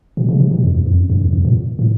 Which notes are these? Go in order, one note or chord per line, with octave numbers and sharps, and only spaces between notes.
B2
C#3
C3
B2
F2
E2
F2
F#2
G2
E2
F2
A#2
A2